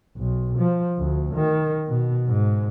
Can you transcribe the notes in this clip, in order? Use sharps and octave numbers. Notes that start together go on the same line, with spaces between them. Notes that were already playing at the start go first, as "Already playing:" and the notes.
B1
F3
D2
D#3
B2
G#2